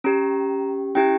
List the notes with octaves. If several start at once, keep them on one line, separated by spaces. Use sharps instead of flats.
C#4 G4 A#5
C#4 E4 G4 G5